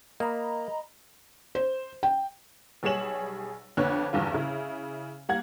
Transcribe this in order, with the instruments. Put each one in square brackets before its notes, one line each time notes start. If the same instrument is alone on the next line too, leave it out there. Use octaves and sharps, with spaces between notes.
[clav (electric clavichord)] A#3 [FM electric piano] D#5 A#5 B5
[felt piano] C5
G5
[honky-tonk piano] B1 G3 G#4 C#5 E7 F#7
F2 D3 B3 C#5 F#6
F1 E2 G2 D3 F4
C#3 E4
G3 A#3 F#5 G#6